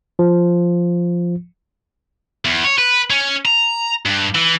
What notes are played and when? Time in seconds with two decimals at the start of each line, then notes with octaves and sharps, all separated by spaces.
0.19 F3
2.45 E2
2.64 C#5
2.78 B4
3.10 C#4
3.46 A#5
4.05 G2
4.35 E3